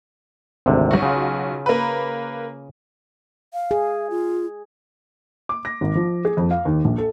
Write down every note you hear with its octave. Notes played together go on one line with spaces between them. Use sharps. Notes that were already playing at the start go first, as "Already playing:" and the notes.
G#1 D2 C3
B1 F#4
C#3 F4
A#3 B4
F5
G#4
F4
D6
A#6
G#1
F3
G#4
F2
F5
D#2
A#1
A4